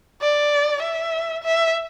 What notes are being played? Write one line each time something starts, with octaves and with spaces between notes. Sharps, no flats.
D5
E5
E5